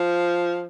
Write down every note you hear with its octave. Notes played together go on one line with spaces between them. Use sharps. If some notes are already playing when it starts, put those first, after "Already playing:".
Already playing: F3